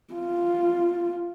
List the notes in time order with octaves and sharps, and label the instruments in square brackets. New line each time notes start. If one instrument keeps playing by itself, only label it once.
[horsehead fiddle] F4